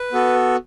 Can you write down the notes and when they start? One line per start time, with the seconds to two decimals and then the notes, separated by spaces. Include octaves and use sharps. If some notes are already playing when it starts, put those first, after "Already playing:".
Already playing: B4
0.12 B3 F#4 A4